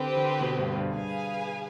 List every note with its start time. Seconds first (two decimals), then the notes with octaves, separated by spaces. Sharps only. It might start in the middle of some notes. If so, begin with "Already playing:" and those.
Already playing: D3 C4 G4 B4
0.16 D3
0.41 B2
0.59 G2
0.76 G2
0.93 G2 G#4 B4 F5 G#5